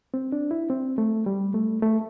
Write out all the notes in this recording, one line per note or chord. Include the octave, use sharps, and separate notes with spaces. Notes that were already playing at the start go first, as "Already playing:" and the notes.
C4
D4
E4
C4
A3
G3
A3
A3